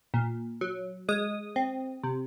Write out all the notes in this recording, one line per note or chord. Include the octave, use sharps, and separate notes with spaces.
A#2
F#3
G#3 D#6
C4
C3